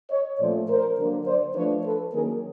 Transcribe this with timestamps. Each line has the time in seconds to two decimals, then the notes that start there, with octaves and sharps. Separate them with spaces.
0.11 C#5 D#5
0.40 A#2 F3 A3 C#4 C5 D5
0.69 A#4 C5
0.98 D3 F#3 A#3
1.26 C5 D5
1.55 F3 A3 D4 B4 C#5
1.85 A4 B4
2.13 D#3 F#3 A#3 C#4 G#4 A#4